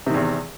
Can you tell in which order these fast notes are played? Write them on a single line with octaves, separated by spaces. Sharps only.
C3 D#3 E2